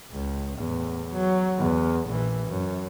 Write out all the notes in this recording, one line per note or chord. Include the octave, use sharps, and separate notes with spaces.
C#2
E2 A2
F#3
E2
A#1 E3
F#2